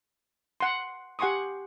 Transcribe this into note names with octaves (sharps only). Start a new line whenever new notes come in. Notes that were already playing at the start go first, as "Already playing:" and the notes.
F#5 C6
G4 F#5 G#5 C6 C#6 D#6